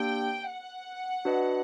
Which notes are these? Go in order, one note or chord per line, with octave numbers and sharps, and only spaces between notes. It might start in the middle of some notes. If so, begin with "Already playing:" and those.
Already playing: A#3 D4 G4 G5
F#5
D4 F#4 B4 D#5